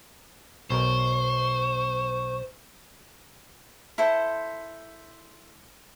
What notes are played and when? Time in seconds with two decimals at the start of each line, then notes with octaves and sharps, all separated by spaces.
0.70 B1 B2 A#4 C5 C#6
3.98 E4 A4 C5